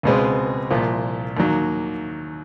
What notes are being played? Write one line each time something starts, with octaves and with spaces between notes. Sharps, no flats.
C#2 B2 G#3 C4
C2 A#2 F3
D#2 D#3 F#3 A#3